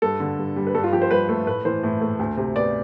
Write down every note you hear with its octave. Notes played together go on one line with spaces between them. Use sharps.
G2 A4
D3
G2
G3
B4
G2 A4
F4
F3 G4
C5
G2 B4
A3
A2 B4
E3 C5
A2
A3
D2
C3
B3 D5